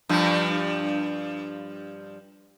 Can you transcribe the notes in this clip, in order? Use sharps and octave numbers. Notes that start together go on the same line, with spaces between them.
G2 F3